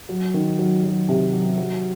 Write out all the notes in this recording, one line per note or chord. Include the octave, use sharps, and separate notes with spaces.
F#3
D#3
F#3
F#3
C3
F#3
F#3